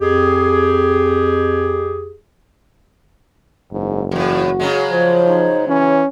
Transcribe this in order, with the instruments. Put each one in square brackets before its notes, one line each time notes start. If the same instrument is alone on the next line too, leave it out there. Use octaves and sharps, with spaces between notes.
[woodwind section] F2 G4 G#4
[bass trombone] F#1 [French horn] G#2
[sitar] E2 A2 [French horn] F#4
[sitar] C#3 F#3 G#3
[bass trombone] F3 [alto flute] C5
[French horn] D#4
[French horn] E3 [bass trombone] C#4